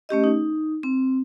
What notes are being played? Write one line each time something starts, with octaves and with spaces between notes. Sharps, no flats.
A3 C#4 G4 D#5
D#4
C4